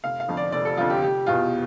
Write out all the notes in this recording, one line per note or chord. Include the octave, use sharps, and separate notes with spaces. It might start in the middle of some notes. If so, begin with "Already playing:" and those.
F1 F5
F5
F2 D3 F3
D5
F1 D5
A4
F2 D3 F3 F4
G4
F1 G4
E2 B2 F4